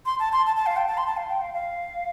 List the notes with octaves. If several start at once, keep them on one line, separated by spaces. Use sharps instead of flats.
C6
A5
C6
A5
A5
F5
G5
A5
C6
A5
F5
G5
F5
F5